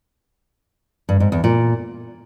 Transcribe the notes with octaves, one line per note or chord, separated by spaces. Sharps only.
G2
G#2
E2
A#2